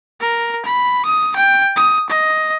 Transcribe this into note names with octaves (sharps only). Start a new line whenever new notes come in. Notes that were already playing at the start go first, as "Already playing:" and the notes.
A#4
B5
D#6
G5
D#6
D#5